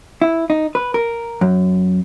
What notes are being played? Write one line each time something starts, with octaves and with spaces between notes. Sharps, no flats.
E4
D#4
B4
A#4
F#2